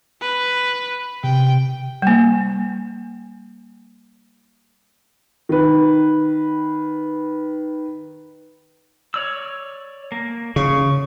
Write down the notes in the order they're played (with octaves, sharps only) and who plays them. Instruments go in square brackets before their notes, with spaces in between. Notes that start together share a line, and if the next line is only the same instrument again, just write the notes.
[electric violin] B4
[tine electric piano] C3 [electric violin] G5
[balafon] G3 A#3
[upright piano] D#3 B4
[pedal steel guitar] C#5 D5 E6
A#3
[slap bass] C#3 [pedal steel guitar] C#6